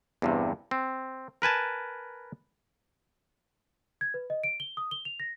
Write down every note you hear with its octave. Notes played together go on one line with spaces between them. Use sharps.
E2 G2 C3
C4
A#4 B4 G#5 A5
G#6
B4
D#5
D7
G7
D#6
G7
F7
A#6